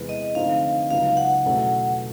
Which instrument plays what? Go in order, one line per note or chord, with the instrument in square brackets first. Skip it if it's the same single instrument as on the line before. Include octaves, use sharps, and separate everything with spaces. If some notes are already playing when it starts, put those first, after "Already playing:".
Already playing: [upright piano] E2 C3 E3 G#3 B3
[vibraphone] D#5
[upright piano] D3 F3 A3 C4 D#4 [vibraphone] F5
[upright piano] C#2 C#3 F#3 B3 D#4 [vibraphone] F5
[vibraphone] F#5
[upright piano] E2 B2 F#3 A3 C#4